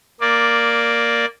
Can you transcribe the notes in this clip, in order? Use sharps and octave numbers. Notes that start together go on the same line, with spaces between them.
A#3 D5